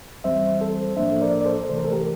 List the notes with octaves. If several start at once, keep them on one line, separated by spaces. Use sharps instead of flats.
E2 E3 G3 C4 C5 E5
A4 C5
A2 F3 A#3 D4 C5 E5
A#4 D5
D5
A4 C5
C3 E3 A3 C5
A#4
A4
G4 A#4